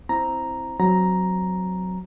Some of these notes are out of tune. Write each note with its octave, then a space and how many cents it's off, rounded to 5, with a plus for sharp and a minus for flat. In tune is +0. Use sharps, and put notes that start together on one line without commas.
C4 +0 E4 -5 A#5 +0
F#3 +0 C4 +0 A#5 +5